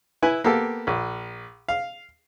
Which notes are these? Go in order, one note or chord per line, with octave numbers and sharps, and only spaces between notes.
E4 B4 G#5
A#3 B3 G4 A4
A#1
F5